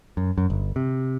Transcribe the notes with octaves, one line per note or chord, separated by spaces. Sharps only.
F#2
F#2
G1
C3